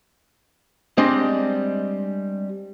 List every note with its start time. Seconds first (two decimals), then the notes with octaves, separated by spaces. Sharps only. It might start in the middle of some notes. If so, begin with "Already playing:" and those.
0.97 G3 G#3 C4 D4 D#5